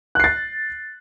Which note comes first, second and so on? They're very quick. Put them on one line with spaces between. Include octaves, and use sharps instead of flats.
F#6 C7 A6